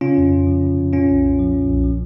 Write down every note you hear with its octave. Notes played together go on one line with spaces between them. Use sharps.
C#3 C#4 F4
F2
F2
F3
C#3
F2
A#2 C#4 F4
B1
B1
F3
A#2
B1
F3